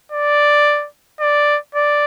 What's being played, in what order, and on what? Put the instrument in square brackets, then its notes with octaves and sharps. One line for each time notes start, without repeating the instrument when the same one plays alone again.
[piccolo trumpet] D5
D5
D5